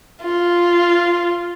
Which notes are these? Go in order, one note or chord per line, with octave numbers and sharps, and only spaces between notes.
F4